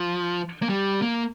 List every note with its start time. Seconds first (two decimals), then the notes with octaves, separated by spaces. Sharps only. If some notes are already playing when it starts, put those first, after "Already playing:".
Already playing: F3
0.62 A#3
0.69 G3
1.02 A#3